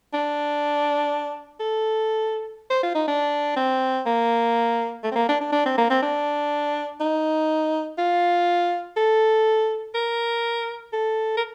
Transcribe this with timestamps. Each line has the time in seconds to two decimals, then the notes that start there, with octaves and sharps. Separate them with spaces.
0.14 D4
1.60 A4
2.71 C5
2.83 F4
2.95 D#4
3.08 D4
3.57 C4
4.06 A#3
5.04 A3
5.12 C4
5.16 A#3
5.29 D4
5.41 D4
5.52 D4
5.66 C4
5.78 A#3
5.90 C4
6.02 D4
7.00 D#4
7.98 F4
8.97 A4
9.95 A#4
10.93 A4
11.37 A#4